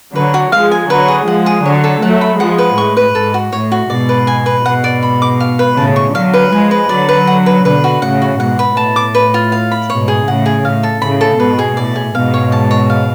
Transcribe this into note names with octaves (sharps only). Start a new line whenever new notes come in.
D3 F#3 B4
F#4
F3 G#3 F5
G#5
D3 F#3 B4
G#4
F3 G#3 F#5
G#4
D3 F#3 C#5
A4
F#3 A3 F#5
B5
F3 G#3 F#5
B4
A2 C#6
B4
G#2 A4
F#4
A2 C#5
F#4
G#2 B2 D5
B4
G#5
B4
G#2 B2 F#5
D5
B5
D6
F5
B4
A2 C#3 A5
C#6
D3 F#3 F5
B4
F3 G#3 G#5
B4
D3 F#3 D5
B4
F#5
B4
B2 D3 B4
F#4
A2 C#3 F#5
F#4
G#2 B2 F#5
B4
A2 A5
D6
B4
F4
F5
B5
G#2 B2 C#5
G#4
A2 C#3 F#5
G#4
A2 F5
A4
A2 C#3 B5
A4
G#2 B2 B4
G#4
A2 D5
G#4
G#2 B2 F5
C#5
A5
C#5
F5